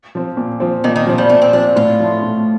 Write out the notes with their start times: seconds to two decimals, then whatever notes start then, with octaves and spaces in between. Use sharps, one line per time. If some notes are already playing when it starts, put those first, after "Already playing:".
0.15 F3 C4
0.37 A#2
0.60 F3 C4
0.84 A#2 D#3
0.96 D#3
1.06 F3 C4
1.18 G3
1.30 A#2 A3
1.42 C4
1.53 F3 C4 D4
1.76 A2 F4
2.00 F3 A3
2.23 A2